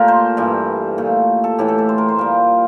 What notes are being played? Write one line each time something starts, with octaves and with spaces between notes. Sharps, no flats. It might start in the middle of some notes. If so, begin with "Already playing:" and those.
Already playing: A#2 A3 F4 G4 A#4
C5
G2 E3 G3
A#2 A3
A4
A2 E3 A3 G4
A4
A4
C5
A#4
C5
A#2 G3 A#4